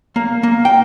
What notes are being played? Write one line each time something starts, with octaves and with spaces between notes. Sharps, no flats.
A#3
A#3
G5